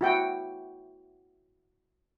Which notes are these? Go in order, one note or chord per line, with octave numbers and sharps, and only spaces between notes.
E4 F#4 G5